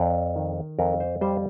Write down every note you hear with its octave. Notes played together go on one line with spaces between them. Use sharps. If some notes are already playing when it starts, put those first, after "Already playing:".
Already playing: F2 D5
D#3
F2 A#4
C5
G3 C5